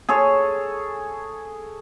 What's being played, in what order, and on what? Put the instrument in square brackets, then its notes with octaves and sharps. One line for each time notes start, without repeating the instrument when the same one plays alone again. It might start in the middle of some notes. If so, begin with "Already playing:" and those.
[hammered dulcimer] G#4 A4 C#5